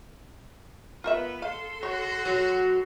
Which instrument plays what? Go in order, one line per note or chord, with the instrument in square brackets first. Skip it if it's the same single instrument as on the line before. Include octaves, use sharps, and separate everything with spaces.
[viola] B3 B4 [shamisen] F4 A#4 E5
[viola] A4 C6 [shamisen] F5
[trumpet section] F#4 [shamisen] C#5
[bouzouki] F#3